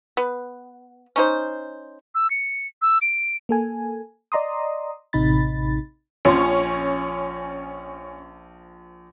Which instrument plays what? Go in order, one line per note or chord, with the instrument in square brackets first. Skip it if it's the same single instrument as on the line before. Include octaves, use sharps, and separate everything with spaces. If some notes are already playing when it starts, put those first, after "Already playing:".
[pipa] B3
C#4 D#4 C5
[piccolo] E6
C#7
E6
D7
[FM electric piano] A#3 A4 G#5
D5 D#5 A#5 C6 D#6
A1 C3 D#4 B5 A6
[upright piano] A#1 F3 C6 [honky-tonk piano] C#4